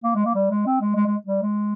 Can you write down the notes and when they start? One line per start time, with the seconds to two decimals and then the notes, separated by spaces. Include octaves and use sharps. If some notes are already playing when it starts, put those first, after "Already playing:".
0.04 A#3
0.15 G#3
0.25 A#3
0.35 G3
0.51 G#3
0.66 C4
0.81 G#3
0.96 G#3
1.07 G#3
1.27 G3
1.42 G#3